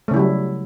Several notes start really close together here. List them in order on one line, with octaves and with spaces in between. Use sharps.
A3 C#3 E4 G3 F#3